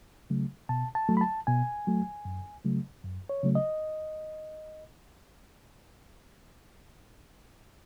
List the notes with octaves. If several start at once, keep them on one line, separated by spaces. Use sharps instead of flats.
C#3 F#3 A3
B2 A5
A5
F#3 A3
B5
A5
B2 G#5
F#3 A3
F#2
C#3 F#3 A3
F#2
C#5
C#3 F#3 A3
D#5